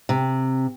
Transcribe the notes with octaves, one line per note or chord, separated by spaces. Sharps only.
C3